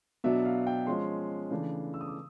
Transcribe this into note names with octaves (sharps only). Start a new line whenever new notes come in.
B2 F#3 B3 D4 E5
F5
G5
F3 G#3 C#4 C6
C#3 E3 A3 D4
E6
D#6
D6